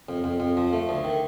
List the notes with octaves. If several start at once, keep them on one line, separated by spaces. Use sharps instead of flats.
F2
F2
F2
F3
A3
D2
D#3